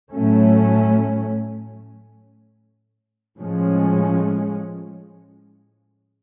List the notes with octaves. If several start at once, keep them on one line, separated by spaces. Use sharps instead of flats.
A2 F#3 A3 C#4
A2 F3 G#3 C#4